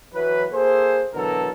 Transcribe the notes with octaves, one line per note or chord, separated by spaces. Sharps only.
E3 F#3 B4
A#3 G#4 A4 C5
B2 D3 E3 F#3 A4 A#4